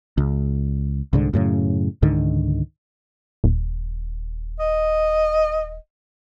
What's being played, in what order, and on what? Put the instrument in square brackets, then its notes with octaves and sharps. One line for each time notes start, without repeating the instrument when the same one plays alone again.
[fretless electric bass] C#2
C2 G#2 D3
F#2 A2 C#3
C#2 G#2 D3 D#3
[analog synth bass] D#1
[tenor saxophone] D#5